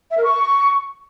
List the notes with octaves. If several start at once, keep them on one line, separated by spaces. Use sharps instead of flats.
E5
A#4
C#6